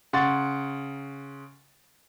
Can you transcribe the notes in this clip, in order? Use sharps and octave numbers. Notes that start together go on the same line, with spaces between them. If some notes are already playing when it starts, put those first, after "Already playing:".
C#3 F#5 C6 C#6 A6